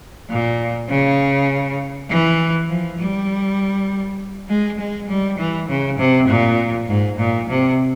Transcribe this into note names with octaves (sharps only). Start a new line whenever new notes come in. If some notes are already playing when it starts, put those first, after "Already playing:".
A#2
C#3
E3
F3
G3
G#3
G#3
G3
E3
C#3
C3
A#2
G#2
A#2
C3